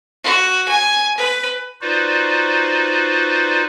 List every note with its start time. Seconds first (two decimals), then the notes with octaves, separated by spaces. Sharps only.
0.24 F#4
0.68 G#5
1.17 B4
1.81 D#4 F4 F#4 B4 C5 D5